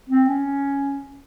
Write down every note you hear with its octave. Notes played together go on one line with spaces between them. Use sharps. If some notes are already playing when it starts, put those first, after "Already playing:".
C4
C#4